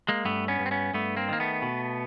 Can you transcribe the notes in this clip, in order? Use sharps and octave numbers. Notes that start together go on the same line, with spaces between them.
G#3 A#3
G2 A3 B3
B3 C#4
G2
C4
B3 C#4
G2 A3 B3
A#3 C4
D#3 A#3
A3 B3
B2